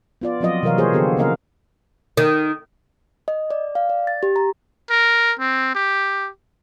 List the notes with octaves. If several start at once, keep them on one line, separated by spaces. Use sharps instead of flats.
B3 F4 D5
F3 F#3 C4 F4 D#5
C3 E3 F#3 A#4 C#5 F5
A#3 F4 G#4 C5 C#5
D3 B3 G4 A4
C#3 A#3 C#4 A#4 D#5 F5
D#3
D#5
D5
F5
D5
A6
G4
A#5
A#4
C4
G4